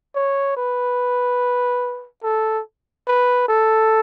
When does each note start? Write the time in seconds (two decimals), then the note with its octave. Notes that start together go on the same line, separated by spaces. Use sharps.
0.15 C#5
0.57 B4
2.23 A4
3.07 B4
3.48 A4